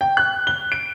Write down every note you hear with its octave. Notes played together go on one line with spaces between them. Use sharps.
G5
F#6
G7
D7